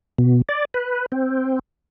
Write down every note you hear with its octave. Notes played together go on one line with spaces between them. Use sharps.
B2
D5
B4
C4